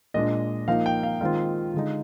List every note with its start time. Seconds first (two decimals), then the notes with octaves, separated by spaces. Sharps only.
0.14 A#2 G#3 D4 D#5
0.68 F3 A#3 D#4 F5
0.86 G5
1.03 F5
1.21 D#3 G#3 C4 F4 F5
1.74 D3 G#3 D#4